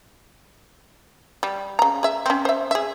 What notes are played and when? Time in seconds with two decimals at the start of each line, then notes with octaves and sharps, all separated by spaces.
1.43 G3
1.79 C#3 A#5
2.03 G#4 E5
2.26 C4 C#4
2.45 C5 E5
2.71 G#4 E5